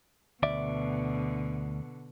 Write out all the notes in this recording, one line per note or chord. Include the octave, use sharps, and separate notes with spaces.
D2 B2 D3 D5 E5